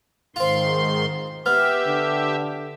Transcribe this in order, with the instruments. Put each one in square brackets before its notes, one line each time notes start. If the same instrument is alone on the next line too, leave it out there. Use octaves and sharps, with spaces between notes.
[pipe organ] G#2 D#3 C6 [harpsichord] C4 F4
[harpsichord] B3 [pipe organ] G4 E5 [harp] F6
[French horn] D3